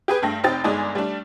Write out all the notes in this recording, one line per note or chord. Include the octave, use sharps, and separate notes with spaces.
G4 G#4 B4
G2 A3 G5 A#6
F1 C4 D#4 G4 G5 A6
G1 G#3 D#4 D5 G#5
G3 A3 D4